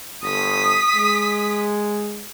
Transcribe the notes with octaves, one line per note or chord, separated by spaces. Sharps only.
G1 D#6 B6
G#3